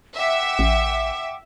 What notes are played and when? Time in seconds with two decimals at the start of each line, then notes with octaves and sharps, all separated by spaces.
0.16 E5 F#5 G5 D6
0.59 A1